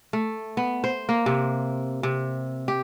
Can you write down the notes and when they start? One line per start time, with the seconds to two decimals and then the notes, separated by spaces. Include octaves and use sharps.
0.13 A3
0.57 B3
0.84 C5
1.09 A#3
1.26 C3
2.03 C3
2.68 G4